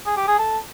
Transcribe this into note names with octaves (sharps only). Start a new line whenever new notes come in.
G#4
G4
G#4
A4